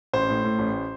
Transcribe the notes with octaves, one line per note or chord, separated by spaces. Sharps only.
A1 C5
A2
A2
A1